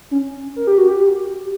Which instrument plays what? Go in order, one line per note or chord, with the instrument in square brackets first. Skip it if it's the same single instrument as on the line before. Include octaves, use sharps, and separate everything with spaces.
[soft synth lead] C#4
A#4
G4
F#4
G4